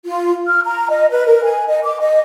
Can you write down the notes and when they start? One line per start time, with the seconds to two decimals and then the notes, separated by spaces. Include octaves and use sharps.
0.05 F4
0.46 F6
0.64 A#5
0.90 D#5
1.10 B4
1.26 A#4
1.44 G#5
1.68 D#5
1.84 D6
2.00 D#5